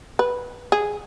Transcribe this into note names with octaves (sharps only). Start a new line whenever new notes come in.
B4
G#4